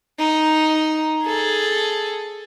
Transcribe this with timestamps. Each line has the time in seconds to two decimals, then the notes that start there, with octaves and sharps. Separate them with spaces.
0.19 D#4
1.24 G#4 A4